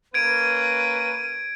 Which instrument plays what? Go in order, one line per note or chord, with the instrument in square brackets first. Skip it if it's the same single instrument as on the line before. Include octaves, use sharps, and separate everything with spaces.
[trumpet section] A#3 C#4 B4 [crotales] G#6 D7 [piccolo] D#7